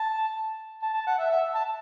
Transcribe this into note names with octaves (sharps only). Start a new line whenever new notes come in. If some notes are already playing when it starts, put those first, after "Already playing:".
Already playing: A5
A5
A5
F#5
E5
E5
A5